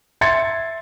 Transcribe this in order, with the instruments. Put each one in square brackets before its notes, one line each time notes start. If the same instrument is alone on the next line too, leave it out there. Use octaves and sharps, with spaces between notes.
[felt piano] E5 C6 G#6 A6 C#7